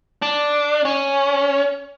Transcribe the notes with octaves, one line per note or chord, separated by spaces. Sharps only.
D4
C#4